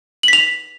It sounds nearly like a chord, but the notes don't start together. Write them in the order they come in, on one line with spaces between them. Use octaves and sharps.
F#7 B6 F7